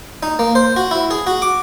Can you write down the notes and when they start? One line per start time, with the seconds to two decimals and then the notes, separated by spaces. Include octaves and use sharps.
0.23 D#4
0.39 A#3
0.55 C5
0.76 F#4
0.91 E4
1.11 G#4
1.27 F#4
1.42 D6